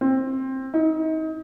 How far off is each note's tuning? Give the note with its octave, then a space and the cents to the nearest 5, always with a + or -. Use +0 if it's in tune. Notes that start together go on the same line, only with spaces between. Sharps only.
C4 +15
D#4 +30